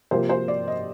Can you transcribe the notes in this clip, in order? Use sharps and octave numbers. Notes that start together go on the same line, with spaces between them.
C3 F3 A#3 C5
C5
D5
D#5